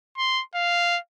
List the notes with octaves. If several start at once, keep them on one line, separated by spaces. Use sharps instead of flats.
C6
F5